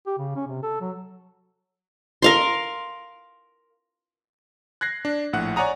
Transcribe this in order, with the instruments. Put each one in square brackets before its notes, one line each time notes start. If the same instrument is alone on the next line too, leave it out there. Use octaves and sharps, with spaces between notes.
[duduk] G4
C#3
C#4
C3
A4
F#3
[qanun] A#4 F5 C6
[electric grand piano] F#6 G#6 A#6 C7
D4
A#1 A2 F#5 F#6
C#5 D5 F#5 G#5 A#5 D#6